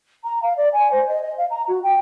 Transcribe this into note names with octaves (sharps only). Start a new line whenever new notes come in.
A#5
F5
D5
G#5
C5
D#5
D#5
F5
A#5
F#4
G5